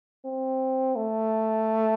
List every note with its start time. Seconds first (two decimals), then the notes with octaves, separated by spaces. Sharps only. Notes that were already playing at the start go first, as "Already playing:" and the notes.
0.25 C4
0.96 A3